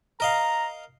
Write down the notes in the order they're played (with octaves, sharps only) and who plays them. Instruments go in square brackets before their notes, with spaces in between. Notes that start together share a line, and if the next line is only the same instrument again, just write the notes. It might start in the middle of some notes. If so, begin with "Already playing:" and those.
[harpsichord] A#4 D#5 F5 [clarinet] A#5